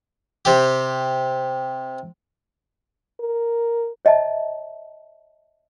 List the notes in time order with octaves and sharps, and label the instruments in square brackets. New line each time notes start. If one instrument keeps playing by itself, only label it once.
[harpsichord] C3 G4
[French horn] A#4
[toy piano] C#5 D#5 E5 A5 A#5